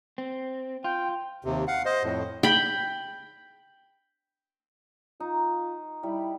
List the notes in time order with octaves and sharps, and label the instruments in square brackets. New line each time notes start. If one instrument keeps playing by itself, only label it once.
[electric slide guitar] C4
[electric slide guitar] F4 [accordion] G5
[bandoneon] D#2 C3
F5 F#5
C5 D#5
F2 A2
[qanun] G5 B5
[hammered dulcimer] D#4 [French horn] F4
[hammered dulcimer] G3 [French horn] E4